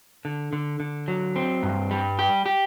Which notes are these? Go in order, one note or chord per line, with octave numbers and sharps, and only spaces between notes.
D3
D3
D3
F#3
C4
G2
G3
G4
G4